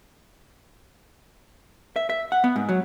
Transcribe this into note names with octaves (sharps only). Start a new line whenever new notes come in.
E5
E5
F#5
B3
G#2
F#3